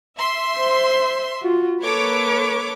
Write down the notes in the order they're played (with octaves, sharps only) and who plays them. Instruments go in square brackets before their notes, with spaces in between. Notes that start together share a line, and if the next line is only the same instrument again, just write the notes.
[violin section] E5 C6
[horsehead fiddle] C5
F4 F#4
[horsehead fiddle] A#3 B4 [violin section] A4 C#5 D6